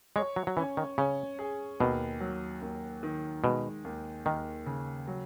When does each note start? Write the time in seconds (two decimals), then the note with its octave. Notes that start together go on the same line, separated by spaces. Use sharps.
0.16 G#3 C#5
0.36 F#3
0.47 F#3
0.57 E3 C#4
0.77 D#3
0.98 C#3 C#4
1.39 G#4
1.80 D#2 B2
2.20 F#3
2.62 D#2
3.03 D#3
3.44 B2 G#3
3.84 D#2
4.25 D#2 D#3
4.66 C#3
5.07 F#3